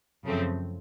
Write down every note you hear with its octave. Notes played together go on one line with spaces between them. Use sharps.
F#2 C#3 F3 A3 C4